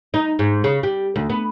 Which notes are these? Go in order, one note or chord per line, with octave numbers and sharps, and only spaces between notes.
D#4
G#2
C#3
G3
D2
B3